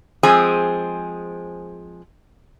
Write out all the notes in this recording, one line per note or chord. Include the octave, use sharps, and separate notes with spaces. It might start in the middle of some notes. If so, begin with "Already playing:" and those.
F3 G#3 C4 G#4 G#5